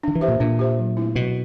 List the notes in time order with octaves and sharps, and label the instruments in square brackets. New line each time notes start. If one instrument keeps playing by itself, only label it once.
[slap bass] D#3 [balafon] D4
[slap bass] E3
[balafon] G4 C5 E5
[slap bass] A#2
[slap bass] A#2 [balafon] D4
[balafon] G4 C5 E5
F#3
A3 C4 E4
[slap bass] B2 [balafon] F#3